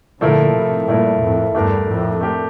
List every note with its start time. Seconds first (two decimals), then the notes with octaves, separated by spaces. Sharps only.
0.21 A#2 D3 F3 A3 E4 A#4
0.54 A2 C3
0.88 G2 A#2 F3 A3 E4 A#4
1.22 F2 A2
1.54 E2 G2 A3 D4 G4 A#4
1.88 F2 A2
2.21 A3 D4 G4 A#4